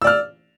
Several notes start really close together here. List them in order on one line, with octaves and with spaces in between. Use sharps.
E6 D5 F6